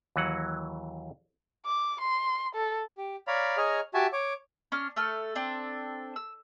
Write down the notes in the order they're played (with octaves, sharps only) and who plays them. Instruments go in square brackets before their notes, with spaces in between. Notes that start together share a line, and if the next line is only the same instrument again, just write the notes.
[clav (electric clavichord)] D#2 E3 F#3 F#5
[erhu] D6
C6
A4
[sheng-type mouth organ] G4
C#5 D5 F5 A#5 B5
G#4 C#5 D#5 A#5 F6
F#4 G4 E5 G#5 A5
C#5 D6
[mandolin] C#4 D4 F6
A3 A4 F6
C4 D4 A4
E6